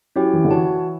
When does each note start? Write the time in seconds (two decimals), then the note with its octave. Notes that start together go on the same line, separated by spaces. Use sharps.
0.16 F#3 C#4 E4 G4 C#5 G5
0.33 E3
0.45 D3
0.51 E3 F#4 C#5 F#5 A5